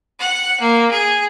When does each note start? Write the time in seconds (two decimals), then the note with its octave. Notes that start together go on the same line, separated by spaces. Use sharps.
0.20 F#5
0.60 A#3
0.91 G#4